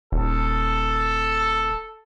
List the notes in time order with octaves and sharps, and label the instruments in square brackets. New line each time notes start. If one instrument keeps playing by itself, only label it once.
[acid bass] D#1 [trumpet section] A4